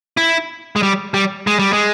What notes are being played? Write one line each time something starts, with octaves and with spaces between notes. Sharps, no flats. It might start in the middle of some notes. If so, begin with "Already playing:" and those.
E4
G#3
G3
G3
G#3
G3
G#3